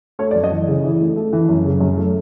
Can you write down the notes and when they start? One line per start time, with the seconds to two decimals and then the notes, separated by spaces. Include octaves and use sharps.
0.19 A3 C#5
0.31 D5
0.35 F#2
0.44 D#5
0.52 E3
0.68 C#3
0.84 E3
1.00 A3
1.16 A3
1.33 E3
1.49 F#2
1.65 C#3
1.80 F#2
1.97 A3